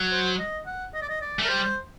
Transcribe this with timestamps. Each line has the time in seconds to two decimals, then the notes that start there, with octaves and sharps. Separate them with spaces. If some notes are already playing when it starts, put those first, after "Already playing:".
Already playing: F#3
0.12 C5
0.39 D#5
0.66 F#5
0.94 D#5
1.02 D5
1.09 D#5
1.21 D5
1.39 A3
1.44 A#4
1.48 G3 C5